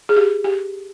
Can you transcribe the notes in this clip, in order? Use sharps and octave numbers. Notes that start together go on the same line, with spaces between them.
G#4
G4
G4